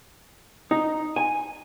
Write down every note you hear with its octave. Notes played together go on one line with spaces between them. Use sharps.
D#4
G#5